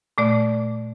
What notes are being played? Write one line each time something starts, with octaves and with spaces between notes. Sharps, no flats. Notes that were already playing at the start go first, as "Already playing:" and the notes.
A#2 A3 D5